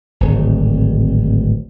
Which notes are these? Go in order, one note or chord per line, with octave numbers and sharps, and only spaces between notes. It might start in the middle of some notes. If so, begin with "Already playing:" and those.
D1 G#1